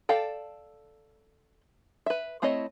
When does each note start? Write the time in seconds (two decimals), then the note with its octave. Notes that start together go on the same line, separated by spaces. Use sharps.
0.09 A4 D5 F5 G5 A5
2.06 B4 E5
2.42 A3 C4 E4 C#5 D#5